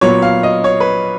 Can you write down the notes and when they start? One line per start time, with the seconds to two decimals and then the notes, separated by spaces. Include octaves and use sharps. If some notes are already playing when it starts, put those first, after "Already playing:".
0.01 A#2 F#3 B3 C#5
0.22 F5
0.43 D#5
0.64 C#5
0.80 B4